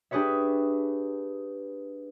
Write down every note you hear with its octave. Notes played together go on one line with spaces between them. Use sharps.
D4 G4 G#4 B4 C#5 E5